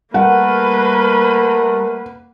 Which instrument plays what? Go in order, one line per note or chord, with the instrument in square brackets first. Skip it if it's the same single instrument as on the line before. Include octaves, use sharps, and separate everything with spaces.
[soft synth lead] G3 [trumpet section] A3 A#4 [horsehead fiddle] A#3 B4 [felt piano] F#5